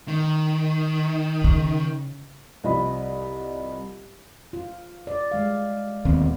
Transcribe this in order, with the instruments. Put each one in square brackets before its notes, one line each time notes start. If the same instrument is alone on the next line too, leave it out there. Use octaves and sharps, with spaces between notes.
[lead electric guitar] D#3
[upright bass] C#3
[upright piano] C2 F3 D#5 B5
[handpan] F4
D5
G3 G#3 F5
[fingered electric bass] D1 D#2 C4 [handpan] B3